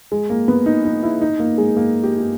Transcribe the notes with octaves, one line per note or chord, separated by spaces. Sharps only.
G#3
A#3
B3
D#4
D#4
E4
D#4
A#3
G#3
A#3
G4
G4